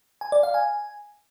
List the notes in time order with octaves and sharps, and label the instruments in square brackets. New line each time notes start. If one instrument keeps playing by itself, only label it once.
[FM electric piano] G#5
D5
F5
G#5